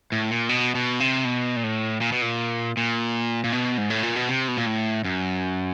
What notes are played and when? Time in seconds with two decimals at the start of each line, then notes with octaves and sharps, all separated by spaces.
0.12 A2
0.31 A#2
0.49 B2
0.75 B2
1.00 C3
1.25 B2
1.56 A#2
1.63 A2
2.01 A#2
2.12 B2
2.22 A#2
2.77 A#2
3.44 A#2
3.52 B2
3.78 G#2
3.90 A2
4.03 A#2
4.16 B2
4.28 C3
4.48 B2
4.57 A#2
4.66 A2
5.04 F#2